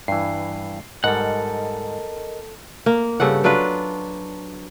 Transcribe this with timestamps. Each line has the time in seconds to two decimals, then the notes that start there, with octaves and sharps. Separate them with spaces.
0.08 G2 E3 C7
1.04 G#2 G3 A4 A#4 D#5 F#5
2.86 A#3
3.20 G2 C#3 A4 F#5
3.44 F#3 D4 F4 B4